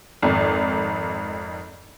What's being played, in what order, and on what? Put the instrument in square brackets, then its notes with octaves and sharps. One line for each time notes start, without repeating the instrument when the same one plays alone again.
[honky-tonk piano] G#1 F2